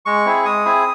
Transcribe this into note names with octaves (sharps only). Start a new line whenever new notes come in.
G#3 C#6
C4 E4 G#4
G#3 D#6
C4 E4 G#4